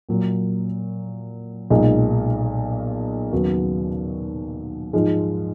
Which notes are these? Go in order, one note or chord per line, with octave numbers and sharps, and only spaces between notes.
A#2 F#3 A#3
B1 A#2 G#3 D#4
D#2 C#3 F#3 B3 F#4
G#2 F3 G#3